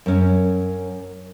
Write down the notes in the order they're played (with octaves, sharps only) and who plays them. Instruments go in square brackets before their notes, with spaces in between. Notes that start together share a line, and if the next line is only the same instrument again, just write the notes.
[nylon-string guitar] F#2 C#4